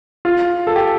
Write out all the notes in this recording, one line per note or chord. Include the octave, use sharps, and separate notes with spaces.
F4
A4
G4